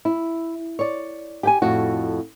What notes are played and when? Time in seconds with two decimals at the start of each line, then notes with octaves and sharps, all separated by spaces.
0.05 E4
0.79 C#5 D5
1.43 G4 G5 G#5
1.62 F2 A2 F#4